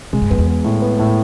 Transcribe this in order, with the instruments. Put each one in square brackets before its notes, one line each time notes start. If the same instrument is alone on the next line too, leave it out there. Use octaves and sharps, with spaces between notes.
[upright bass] B2 [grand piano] G#3
[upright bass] G2
[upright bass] F#2 [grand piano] B3
[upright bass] E2
[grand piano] B3
A2
B3
A2